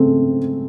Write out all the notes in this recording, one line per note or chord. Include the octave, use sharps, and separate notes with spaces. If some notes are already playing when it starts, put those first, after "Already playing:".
Already playing: C#3 A3 C4